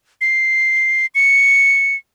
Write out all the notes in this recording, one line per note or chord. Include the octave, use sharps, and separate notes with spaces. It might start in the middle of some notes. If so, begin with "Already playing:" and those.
C7
C#7